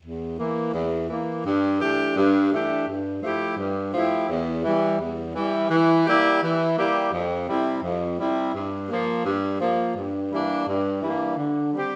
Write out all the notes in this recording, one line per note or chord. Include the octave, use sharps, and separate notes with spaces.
E2
E3 A#3
E2
E3 A#3
G2
E3 A3 D4 G4
G2
E3 A3 D4 G4
G2
F3 A3 E4 G4
G2
F3 A3 E4 G4
E2
E3 G3
E2
E3 G3
E3
G3 A#3 E4 G4
E3
G3 A#3 E4 G4
F2
C3 G3 C4 E4
F2
C3 G3 C4 E4
G2
F3 A#3
G2
F3 A#3
G2
E3 G3 A#3 D4
G2
E3 G3 A#3 D4
D3
G3 C4 G4